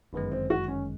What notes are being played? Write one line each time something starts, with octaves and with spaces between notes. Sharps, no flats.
G1 F#2 D#3 G#3 B3
C4
F#4
C#4